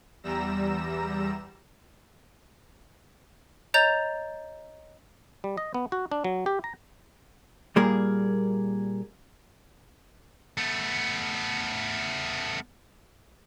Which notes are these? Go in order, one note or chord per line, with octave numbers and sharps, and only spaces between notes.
E2 G3 A#5 E6 A#6 E7
C#5 D#5 A#5 G6 A6 F7
G3
D#5
B3
F#4
D4
F#3
G4
A#5
A#2 G3 A#3 G#4 A#4
A3 B3